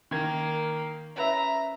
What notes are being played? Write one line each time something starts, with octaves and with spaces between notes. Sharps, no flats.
D#3 A#3 G#6
C#4 B4 E5 A#5